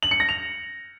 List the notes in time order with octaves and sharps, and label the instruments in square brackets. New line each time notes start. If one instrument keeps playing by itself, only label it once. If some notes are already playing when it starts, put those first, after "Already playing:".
[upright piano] F#7
C#7
A#6
F7